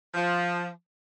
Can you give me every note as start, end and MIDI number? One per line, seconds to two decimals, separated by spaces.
0.14 0.70 53